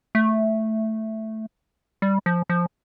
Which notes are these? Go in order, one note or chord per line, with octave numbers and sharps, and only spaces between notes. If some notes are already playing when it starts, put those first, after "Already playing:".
A3
G3
F3
F3